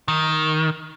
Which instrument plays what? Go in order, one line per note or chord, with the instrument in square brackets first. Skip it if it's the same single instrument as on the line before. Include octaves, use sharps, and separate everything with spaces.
[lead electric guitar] D#3